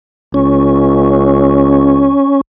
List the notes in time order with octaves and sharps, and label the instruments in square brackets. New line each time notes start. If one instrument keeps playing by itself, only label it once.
[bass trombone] C#2 [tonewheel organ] C#4